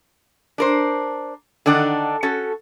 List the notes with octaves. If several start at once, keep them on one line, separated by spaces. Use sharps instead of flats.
D4 A#4 C5
D3 D#3 D4 D#4 F#5
C#4 F#4 A4